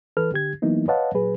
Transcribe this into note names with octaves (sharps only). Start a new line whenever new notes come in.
E3 A4 B4 F6
D3 G4 G#6
E3 F#3 A#3 B3 D#4 E4
B4 C#5 D#5 F5 F#5 A5
A#2 F#3 G#4 B4